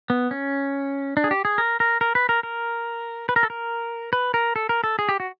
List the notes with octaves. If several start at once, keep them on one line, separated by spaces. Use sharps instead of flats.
B3
C#4
D4
G#4
G4
G#4
A#4
A#4
A#4
B4
A#4
A#4
B4
A#4
A4
A#4
B4
A#4
A4
A#4
A4
G#4
G4
F#4